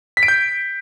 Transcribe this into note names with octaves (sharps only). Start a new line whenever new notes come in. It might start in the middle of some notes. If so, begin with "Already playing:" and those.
B6
D7
G6